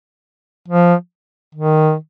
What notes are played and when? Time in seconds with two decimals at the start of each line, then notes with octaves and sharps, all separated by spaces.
0.69 F3
1.55 D#3